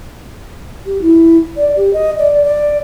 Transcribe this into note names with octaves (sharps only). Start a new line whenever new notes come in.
G4
E4
D5
G4
D#5
D5
D5